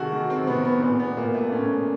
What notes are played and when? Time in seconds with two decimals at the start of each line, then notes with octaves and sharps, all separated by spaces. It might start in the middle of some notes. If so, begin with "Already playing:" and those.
Already playing: C3 D#3 F#4 G#4 A4
0.13 D#3
0.30 C4
0.47 C3 B3
0.65 B3
0.82 A#2 B3
1.00 B3
1.17 A#2 A#3
1.34 A3
1.51 A#2 C#4